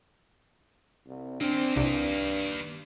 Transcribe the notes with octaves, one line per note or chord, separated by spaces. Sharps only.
C2
D#3 A#3 C4 D4
C2 G2